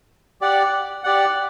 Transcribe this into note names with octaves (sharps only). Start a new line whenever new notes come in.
G4 D5 F#5
G4 D5 F#5